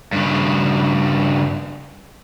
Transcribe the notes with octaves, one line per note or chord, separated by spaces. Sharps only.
G2 C#3